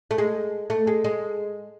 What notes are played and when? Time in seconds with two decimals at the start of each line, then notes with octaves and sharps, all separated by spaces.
0.11 A3
0.18 G#3
0.70 A3
0.87 G#3
1.04 G#3